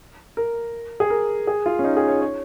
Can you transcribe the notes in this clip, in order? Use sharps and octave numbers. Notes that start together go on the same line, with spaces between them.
A#4
G#4
A#4
G#4
F4
C#4
D#4
G#4
C#5
C#5